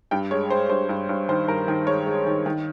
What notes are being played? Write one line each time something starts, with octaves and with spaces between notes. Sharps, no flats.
G2 G5
G#3 C#5
G#3 C5
G2 C5
G2
G2
D#3 C5
G2 A#4
D#3
G#3 C#5
G#3
D#3
D#3